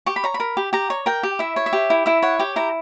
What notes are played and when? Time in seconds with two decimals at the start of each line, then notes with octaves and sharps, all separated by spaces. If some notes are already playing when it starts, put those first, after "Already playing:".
0.06 G4 C#6
0.16 B5
0.24 C#5 A#5
0.34 B5
0.40 A#4
0.57 G4
0.73 G4 A#5
0.90 C#5
1.06 A#4 G5
1.23 G4
1.39 E4 E5
1.56 C#5
1.66 E5
1.73 G4
1.90 E4
2.06 E4 E5
2.22 C#5 F#5
2.39 G4 G5
2.56 E4 A#5